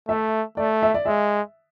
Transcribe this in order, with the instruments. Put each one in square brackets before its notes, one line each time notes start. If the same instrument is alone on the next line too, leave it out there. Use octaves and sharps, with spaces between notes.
[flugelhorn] A3 [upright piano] E5
[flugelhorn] A3 [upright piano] D5
[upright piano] E5
D5
[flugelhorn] G#3 [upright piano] E5